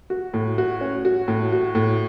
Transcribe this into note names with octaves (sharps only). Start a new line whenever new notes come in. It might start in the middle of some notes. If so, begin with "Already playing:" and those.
F#4
A2
F#4
C#4
F#4
A2
F#4
A2